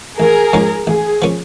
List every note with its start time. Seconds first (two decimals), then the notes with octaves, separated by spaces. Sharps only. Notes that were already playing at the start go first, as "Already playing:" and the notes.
0.19 A1 G#4 A#4
0.53 G#2 F3 A#3 C#4
0.87 A1 G#4
1.22 F3 A#3 C#4